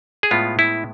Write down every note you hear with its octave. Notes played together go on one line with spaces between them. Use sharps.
G#4
A2 G#3 B3 F4
E4